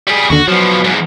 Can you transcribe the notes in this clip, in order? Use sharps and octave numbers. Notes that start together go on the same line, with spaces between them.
G3 G#4
D#2 D3 F#4
B2 F3 F#3
E2 G#2